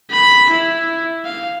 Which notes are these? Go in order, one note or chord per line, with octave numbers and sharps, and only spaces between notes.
B5
E4
F5